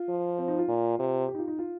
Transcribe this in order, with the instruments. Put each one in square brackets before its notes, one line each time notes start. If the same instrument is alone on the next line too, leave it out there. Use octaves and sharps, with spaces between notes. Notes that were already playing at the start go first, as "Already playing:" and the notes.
Already playing: [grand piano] F4
[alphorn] F3
[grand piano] C4
D#4
F4
[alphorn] A#2
C3
[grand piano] G4
D#4
F4
D#4
F4